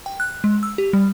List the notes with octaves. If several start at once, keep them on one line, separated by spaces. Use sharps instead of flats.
G5
F#6
G#3
E6
G4
G3